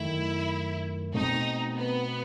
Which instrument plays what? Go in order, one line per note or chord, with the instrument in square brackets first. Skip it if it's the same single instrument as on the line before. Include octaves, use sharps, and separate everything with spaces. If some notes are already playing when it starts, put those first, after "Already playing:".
Already playing: [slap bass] F#2 D#3 A3 [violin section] E4
[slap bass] B2 A3 C4 [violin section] D#4
[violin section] B3